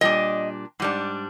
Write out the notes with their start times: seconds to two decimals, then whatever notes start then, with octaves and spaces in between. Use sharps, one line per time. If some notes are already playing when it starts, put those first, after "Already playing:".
0.01 A#2 G3 D4 D#5
0.80 G#2 G3 D4